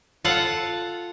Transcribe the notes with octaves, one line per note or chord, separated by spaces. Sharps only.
F4 A4 F5 F#5